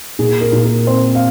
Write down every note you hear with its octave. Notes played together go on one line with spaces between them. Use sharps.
A#2 G#4
A#4
A#2
A#4
C4 C5
F5